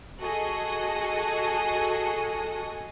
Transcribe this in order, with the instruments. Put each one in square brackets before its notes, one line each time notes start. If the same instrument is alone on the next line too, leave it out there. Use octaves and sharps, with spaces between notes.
[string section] F#4 G#4 A4 D#5